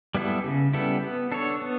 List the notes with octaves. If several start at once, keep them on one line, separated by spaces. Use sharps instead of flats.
G3 B3 E4 A4
C#3
G3 B3 E4 A4
B3
D4 A4 C#5
B3